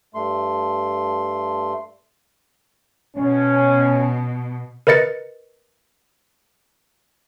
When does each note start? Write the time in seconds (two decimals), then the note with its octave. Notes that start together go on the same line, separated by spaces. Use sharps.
0.15 G2 A3 C6
3.17 B2 C#4
4.87 A#4 B4 D#5 A6 C#7